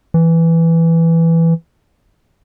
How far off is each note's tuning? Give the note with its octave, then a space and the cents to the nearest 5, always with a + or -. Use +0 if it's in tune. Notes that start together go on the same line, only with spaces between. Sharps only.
E3 +5